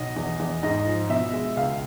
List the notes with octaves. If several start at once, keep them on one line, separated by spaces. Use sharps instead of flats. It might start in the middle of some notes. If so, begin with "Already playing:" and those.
Already playing: B1 D#5
E2
E2
G#2 D#5
F3
B2 E5
G#3
C#2 F5